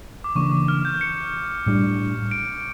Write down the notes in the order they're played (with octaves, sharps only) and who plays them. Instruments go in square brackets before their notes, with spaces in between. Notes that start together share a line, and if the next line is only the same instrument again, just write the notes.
[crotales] D6
[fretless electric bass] C#3 E3 A#3 D4 [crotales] C#6
[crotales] D6
F6
G6
C#7
[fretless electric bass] A2 G3 A#3 D4
[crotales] D7